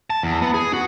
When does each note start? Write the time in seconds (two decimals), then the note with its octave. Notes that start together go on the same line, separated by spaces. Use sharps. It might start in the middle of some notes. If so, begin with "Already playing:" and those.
0.10 A5
0.23 E2
0.42 B3
0.54 G#4
0.73 F#4